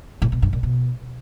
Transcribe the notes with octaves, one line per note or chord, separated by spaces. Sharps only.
A2
B2
G2
A#2
B2